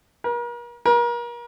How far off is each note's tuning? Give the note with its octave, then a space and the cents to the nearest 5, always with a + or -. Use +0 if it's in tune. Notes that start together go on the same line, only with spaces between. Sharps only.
A#4 +40
A#4 +35